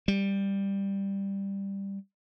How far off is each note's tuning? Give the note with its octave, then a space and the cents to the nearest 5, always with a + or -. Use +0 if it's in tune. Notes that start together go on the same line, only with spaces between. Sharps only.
G3 +10